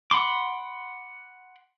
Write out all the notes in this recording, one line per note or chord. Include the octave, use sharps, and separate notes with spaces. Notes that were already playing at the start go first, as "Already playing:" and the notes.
F#5 B5 C6 D6